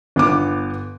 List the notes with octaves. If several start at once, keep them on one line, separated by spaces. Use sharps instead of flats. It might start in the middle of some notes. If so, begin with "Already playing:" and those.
G1 B3 D6